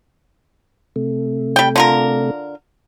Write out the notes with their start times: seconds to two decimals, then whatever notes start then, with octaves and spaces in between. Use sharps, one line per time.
0.96 C3 A3
1.56 G3 G5
1.76 D3 F4 A#4